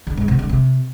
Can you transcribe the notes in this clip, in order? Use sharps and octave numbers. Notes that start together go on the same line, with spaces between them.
D3
G#2
C3
D3
C3